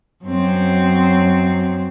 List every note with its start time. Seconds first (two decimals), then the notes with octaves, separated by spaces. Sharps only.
0.24 F#2 C4